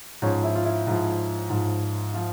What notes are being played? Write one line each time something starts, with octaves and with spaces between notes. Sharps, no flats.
G#2 F3 C#4
E4
F4
E4
G#2 F3
G#2 F3
F3 F4